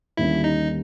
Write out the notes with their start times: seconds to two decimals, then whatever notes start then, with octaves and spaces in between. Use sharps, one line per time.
0.17 D#2 D3 G3 A#3 C#4 E4
0.44 D#4